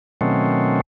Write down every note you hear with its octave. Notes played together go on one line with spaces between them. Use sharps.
B2 D#3 F#3 A3 C4 C#4